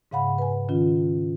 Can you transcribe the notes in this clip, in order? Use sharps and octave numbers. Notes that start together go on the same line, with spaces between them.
G#2 C#3 F5 F#5 B5
B4 G#5
D#3 C#4 F4